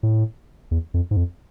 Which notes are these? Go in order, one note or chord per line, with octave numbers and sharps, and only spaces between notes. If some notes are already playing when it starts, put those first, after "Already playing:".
A2
E2
F2
G#2
F2